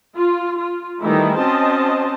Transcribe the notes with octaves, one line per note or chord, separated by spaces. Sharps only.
F4
F4
D#3 E3 G3 A3 D#4 E4
C4 C#4 F#4 C5 D#5 A5